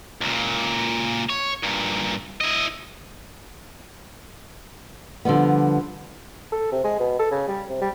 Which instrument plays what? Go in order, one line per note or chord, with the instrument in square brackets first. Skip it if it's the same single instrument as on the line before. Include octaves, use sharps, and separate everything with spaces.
[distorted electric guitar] C#2 A#2
C#5
G2 A#2
E4 D#5
[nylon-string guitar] D3 F3 G3 B3
[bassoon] A4
C3
G#3
B2
A4
C#3
G3
C3
G3